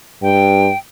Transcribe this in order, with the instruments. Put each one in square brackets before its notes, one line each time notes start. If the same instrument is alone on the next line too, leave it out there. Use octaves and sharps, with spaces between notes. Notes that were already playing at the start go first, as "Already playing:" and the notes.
[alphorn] G2 [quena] G5